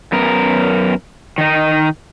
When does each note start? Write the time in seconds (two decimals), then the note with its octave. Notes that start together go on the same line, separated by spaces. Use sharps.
0.12 F#2 B3 A#4
1.38 D#3 D#4